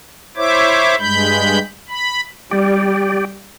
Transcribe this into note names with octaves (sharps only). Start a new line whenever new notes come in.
E4 C5 C#5 E5 D6
G2 G#3 B5 G6
B5
G3 G4 D5